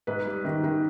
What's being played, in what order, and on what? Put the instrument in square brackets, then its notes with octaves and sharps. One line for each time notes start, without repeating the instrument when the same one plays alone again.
[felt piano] G#2 B4
G3
D#3
D#3